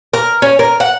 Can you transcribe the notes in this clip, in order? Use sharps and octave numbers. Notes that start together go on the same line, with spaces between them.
A#4
C#4
A#4
F#5